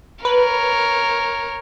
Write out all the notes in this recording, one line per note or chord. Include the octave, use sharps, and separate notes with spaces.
A#4 B4 C#5